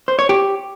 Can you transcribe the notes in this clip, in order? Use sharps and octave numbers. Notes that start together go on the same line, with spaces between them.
C5
C#5
G4